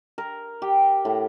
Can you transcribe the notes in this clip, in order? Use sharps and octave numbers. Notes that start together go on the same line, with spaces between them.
A#4
G4
A2